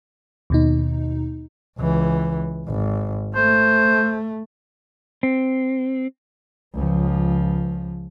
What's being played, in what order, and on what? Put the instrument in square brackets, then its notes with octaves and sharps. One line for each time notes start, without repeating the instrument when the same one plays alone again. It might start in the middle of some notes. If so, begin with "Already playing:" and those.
[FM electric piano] D#2 B2 D#4
[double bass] C#2 E3
G#1
[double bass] A3 [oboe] C5
[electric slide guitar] C4
[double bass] C#2 F3